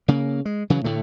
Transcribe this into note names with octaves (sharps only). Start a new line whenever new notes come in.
C#3 A#3
G#3
C#3 E3 F#3
A2 D3 A3